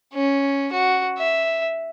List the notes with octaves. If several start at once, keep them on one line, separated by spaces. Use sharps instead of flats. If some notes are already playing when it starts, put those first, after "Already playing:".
C#4
F#4
E5